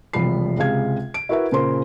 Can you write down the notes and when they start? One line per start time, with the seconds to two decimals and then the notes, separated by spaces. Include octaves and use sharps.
0.13 E1 C2 C3 F3 B5 C7
0.58 C#2 C3 G#3 F5 G#6
1.14 D7
1.29 E4 F#4 A#4 B4 E5
1.52 A#2 C#3 G#4 A#4 C5 C6